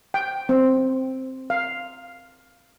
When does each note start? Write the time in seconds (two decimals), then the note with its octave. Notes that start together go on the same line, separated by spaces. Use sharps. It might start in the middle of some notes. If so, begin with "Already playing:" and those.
0.14 G5
0.49 C4
1.50 F5